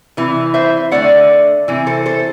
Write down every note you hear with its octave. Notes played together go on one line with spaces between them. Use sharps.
C3 E3
C5 E5
D3 A3 D5 F#5
C3 E3
A4 C5
A4 C5